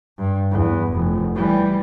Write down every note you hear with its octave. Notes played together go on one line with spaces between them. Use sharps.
G2
E2
F1
E3 G3